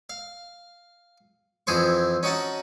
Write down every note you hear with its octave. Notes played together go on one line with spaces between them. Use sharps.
F5
F2 E3 G#4 C5 C#6
C#4 D#4 F#4 F#5 A5